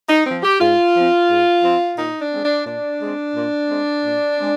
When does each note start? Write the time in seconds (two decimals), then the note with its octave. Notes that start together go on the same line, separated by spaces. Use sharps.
0.08 D#4
0.26 F3 C4
0.43 G4
0.60 G#2 F4
0.95 F3 C4
1.29 G#2
1.63 F3 C4
1.97 A#2 D#4
2.21 D4
2.32 G#3 C4
2.43 D4
2.66 A#2 D4
3.01 G#3 C4
3.35 A#2
3.69 G#3 C4
4.04 A#2
4.38 G#3 C4